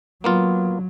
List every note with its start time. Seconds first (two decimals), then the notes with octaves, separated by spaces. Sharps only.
0.24 F#3 A#3 B3 F4